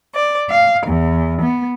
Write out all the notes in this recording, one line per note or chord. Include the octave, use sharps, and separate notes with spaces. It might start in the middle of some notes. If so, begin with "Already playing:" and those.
D5
F5
E2
B3